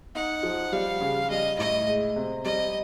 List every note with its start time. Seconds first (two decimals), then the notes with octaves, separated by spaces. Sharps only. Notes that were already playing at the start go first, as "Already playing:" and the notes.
0.15 D#4 F#5
0.43 F3
0.72 G3 F5
1.01 C#3
1.30 G3 D#5
1.59 A2 D#5
1.87 G#3
2.16 C3
2.44 G3 D#5